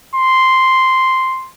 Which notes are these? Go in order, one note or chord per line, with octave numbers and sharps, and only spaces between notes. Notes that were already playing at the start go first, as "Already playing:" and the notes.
C6